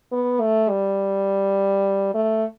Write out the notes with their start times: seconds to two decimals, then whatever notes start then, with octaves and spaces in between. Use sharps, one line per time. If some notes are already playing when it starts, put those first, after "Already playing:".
0.12 B3
0.40 A3
0.69 G3
2.14 A3